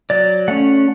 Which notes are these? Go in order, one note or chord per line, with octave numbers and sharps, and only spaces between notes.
F#3 D5
A3 C#4 F#5